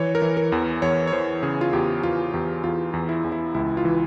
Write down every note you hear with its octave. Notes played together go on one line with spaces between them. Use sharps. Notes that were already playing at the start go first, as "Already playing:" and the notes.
Already playing: E3 C#5
A#4
E3
A#4
E2
E2 C#5
C#5
E3 C5
C#3 G#4
F4
E2 G4
E2 F4
E2 G4
E2 F4
E2
E4
E2
E4
C#2 E4
F4
E3